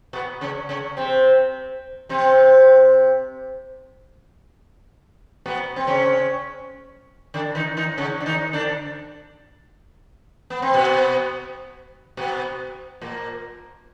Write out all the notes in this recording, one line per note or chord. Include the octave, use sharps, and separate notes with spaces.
B2 B3
C#3 C#4
C#3 C#4
C3 C4
C3 C4
B2 B3
C4
C#3 C#4
D3 D4
D#3 D#4
D#3 D#4
C#3 C#4
D4
D#3 D#4
D3 D4
B3
C4
B2 B3
B2 B3
A#2 A#3